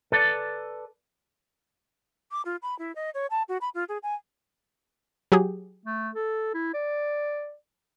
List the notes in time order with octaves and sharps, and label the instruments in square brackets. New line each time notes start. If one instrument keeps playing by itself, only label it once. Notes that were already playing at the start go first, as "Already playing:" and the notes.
[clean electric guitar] A4 B4 D5
[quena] D6
F4
B5
E4
D#5
C#5
A5
F#4
B5
F4
G#4
G#5
[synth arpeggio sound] F#3 G4 G#4
[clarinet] A3
A4
E4
D5